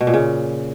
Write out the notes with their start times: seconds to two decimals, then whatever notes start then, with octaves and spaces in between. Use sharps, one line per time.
0.01 B2
0.07 A#2
0.14 C#3